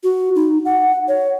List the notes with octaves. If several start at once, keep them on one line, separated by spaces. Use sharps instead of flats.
F#4
D#4
F#5
C#5